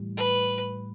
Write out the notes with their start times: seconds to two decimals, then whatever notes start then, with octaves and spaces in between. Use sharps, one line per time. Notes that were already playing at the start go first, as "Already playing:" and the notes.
Already playing: A2 E3 G3
0.17 B4